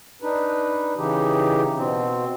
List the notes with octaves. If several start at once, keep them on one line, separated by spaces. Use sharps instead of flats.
D4 D#4 B4
C#3 E3 D#4 G4
B2 C4